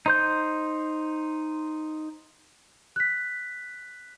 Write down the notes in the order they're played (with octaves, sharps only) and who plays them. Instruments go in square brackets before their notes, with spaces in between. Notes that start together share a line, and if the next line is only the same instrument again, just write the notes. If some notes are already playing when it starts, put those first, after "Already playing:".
[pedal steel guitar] D#4 C5 G6
[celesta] F#6 B6